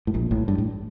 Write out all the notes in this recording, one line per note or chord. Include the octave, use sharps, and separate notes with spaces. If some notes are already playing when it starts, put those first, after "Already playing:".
A2
A#1 A#2
A1 A2
G2
A2